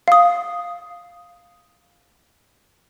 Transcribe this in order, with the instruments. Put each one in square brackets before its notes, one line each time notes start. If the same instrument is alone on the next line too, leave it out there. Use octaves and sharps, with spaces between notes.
[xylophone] F5 D#6